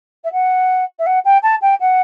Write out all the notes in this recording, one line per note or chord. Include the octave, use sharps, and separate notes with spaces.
E5
F#5
E5
F#5
G5
A5
G5
F#5